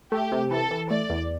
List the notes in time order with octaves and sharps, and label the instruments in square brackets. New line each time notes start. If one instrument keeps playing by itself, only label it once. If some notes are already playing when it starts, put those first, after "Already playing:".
[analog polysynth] A3 [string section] G4
[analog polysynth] C3
[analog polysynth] E3 [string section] A4
[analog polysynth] E3
[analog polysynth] A3 [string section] D5
[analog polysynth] E2